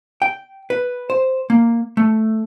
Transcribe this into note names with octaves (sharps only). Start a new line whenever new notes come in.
G5
B4
C5
A#3
A3